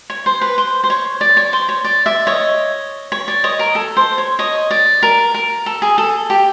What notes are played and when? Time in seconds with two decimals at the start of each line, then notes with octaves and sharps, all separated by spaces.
0.10 C#5
0.26 C5
0.41 B4
0.58 C5
0.84 C5
0.90 C#5
1.21 D5
1.37 C#5
1.53 C5
1.69 C#5
1.84 D5
2.06 D5 E5
2.27 C#5 D#5
3.12 C#5
3.28 D5
3.44 C#5 D#5
3.59 A#4
3.75 A4
3.97 C5
4.18 C#5
4.39 C#5 D#5
4.71 D5
5.03 A#4
5.34 A#4
5.66 A4
5.82 G#4
5.98 A4
6.30 G4